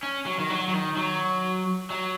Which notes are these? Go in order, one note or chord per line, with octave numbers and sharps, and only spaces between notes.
C#4
F#3
D#3
F#3
F#3
D#3
F#3
F#3